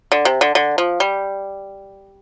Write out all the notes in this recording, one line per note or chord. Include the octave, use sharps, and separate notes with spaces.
D3
C3
D3
D3
F3
G3